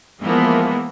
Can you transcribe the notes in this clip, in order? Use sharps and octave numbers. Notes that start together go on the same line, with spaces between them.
E3 F3 G#3 A#3 B3